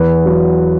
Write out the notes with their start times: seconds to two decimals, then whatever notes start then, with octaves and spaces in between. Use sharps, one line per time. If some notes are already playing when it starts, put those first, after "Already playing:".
Already playing: E2 B4
0.26 F#3